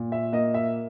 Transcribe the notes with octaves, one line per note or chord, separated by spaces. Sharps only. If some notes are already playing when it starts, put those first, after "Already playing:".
Already playing: A#2
E5
A#3 D#5
E5